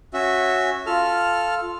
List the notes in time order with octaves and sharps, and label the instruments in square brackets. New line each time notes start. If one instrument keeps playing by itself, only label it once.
[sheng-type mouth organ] C#4 F#4 E5
[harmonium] F4 [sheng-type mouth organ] A4 F6